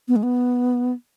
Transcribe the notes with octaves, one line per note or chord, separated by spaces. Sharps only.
B3
G#3
B3